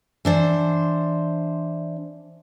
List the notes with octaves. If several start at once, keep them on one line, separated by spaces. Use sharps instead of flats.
E3 D4 C5